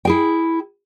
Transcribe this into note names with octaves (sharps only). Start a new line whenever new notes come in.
E4 G#4 G5